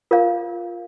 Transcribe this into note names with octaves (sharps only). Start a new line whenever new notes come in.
F4 A#4 D5 F5